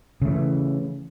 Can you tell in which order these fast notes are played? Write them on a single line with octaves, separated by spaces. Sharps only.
C#3 A3 E3